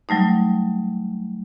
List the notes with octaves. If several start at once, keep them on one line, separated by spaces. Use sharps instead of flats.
F#3 G3 A3 D#4